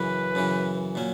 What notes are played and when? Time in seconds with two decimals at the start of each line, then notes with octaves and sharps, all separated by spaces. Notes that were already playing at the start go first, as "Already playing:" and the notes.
Already playing: F#2 C#3 E3 B4
0.35 F#2 C#3 E3
0.95 A#2 F#3 C#4